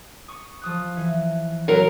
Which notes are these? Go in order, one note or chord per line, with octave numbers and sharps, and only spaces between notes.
C#6 D#6
F3 D#6 F#6
E3
F#3 A#4